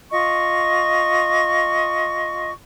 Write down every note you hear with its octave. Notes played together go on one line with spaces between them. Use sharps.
F4 D#5 C#6